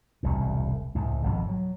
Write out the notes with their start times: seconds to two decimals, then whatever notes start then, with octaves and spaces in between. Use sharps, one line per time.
0.23 E1 C2 A2
0.95 C#2 A2
1.23 G#1 F2 B2
1.48 F#3